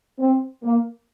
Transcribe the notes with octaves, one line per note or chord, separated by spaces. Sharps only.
C4
A#3